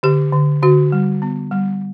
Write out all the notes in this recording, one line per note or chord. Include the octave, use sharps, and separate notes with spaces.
D3 G4
D3
D3 F#4
G3
B3
G3